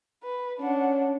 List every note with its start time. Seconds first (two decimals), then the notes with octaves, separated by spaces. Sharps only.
0.24 B4
0.60 C#4 D4 F#5